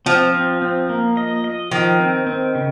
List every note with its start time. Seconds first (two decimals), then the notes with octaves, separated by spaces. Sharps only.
0.06 F3 C4
0.34 C4
0.62 C4
0.89 A#3
1.17 D#5
1.44 D#5
1.71 D#3 F3
1.99 C4
2.27 C4
2.55 C#3